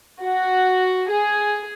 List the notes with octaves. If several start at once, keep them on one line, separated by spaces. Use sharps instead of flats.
F#4
G#4